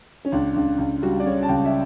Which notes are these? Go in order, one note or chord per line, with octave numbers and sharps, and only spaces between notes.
C#4
C#2 D4
C#2 D4
C#2
G3 F#4
D5
C#3 C#5
A5
C#2 G5
E5